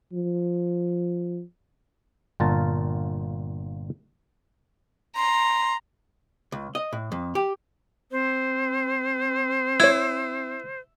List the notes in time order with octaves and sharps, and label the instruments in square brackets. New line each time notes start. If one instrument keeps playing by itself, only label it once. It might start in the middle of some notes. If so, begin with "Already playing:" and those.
[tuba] F3
[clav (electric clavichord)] G1 A#2 F4 A#4 A5
[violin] A#5 [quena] C6
[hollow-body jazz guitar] C#2
D#5
A2
F2
G4
[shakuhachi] C4 [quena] C5
[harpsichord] E4 [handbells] C#5 G#6